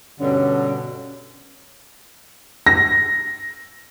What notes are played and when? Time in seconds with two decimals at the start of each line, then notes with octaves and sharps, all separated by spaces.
0.21 G2 B2 D3 C#4
2.67 A#6